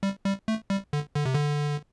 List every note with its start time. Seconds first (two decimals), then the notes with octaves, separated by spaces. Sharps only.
0.03 G3
0.26 G3
0.48 A3
0.70 G3
0.93 D3
1.15 D3
1.25 C3
1.34 D3